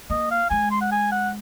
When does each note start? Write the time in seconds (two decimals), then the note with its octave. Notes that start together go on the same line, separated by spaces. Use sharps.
0.10 A#3 D#5
0.31 F5
0.50 G#3 G#5
0.71 C6
0.81 F#5
0.92 G#5
1.12 F#5